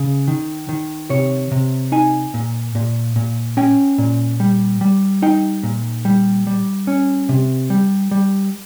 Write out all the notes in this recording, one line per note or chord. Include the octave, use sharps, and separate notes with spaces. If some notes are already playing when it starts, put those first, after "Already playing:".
Already playing: C#3
D#3
D#3
C3 C#5
C3
D#4 G#5
A#2
A#2
A#2
C#4 G5
A#2
G3
G3
D#4 G5
A#2
G3
G3
C#4
C3
G3
G3